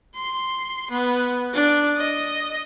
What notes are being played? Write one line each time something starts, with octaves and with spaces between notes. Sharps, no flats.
C6
B3
D4
D#5